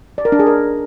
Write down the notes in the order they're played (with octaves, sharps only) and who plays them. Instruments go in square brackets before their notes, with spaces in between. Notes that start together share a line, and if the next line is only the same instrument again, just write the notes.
[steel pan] D5
A#4
D4
G#4
A#4